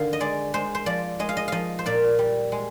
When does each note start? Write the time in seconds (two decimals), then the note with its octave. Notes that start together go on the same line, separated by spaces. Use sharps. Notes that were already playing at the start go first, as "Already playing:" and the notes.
Already playing: D3 D#3 F5
0.13 D#5
0.20 G#3 D5
0.54 G#3 C5
0.75 C5
0.86 F3 D5
1.19 G#3 D#5
1.29 F5
1.37 D#5
1.48 F3 D#5 F5
1.79 C5
1.86 A#2 D5
2.19 G3
2.52 G#3